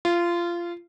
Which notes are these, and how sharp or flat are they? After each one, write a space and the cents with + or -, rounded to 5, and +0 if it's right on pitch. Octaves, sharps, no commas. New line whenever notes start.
F4 -20